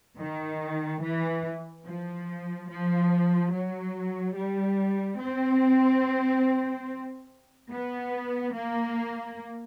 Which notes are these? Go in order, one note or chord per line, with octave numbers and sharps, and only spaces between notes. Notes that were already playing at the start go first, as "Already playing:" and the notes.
D#3
E3
F3
F3
F#3
G3
C4
B3
A#3